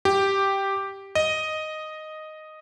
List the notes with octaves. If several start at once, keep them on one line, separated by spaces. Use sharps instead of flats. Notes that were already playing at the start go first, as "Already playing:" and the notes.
G4
D#5